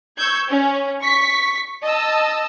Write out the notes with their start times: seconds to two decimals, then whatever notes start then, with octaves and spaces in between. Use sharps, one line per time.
0.17 C#6 E6 G6 G#6
0.49 C#4
1.01 C#6 B6
1.82 D#5 A5 E6